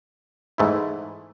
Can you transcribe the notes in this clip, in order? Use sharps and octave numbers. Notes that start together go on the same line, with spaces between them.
G#2 E3 A3 E4